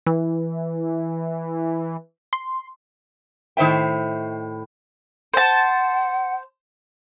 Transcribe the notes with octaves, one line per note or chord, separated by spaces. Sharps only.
E3
C6
A2 D#3 C5 E5 G5
C5 F#5 A5